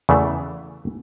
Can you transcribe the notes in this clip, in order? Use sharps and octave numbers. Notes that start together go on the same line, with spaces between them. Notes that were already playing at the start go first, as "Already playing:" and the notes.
E2 C#3 E3 A3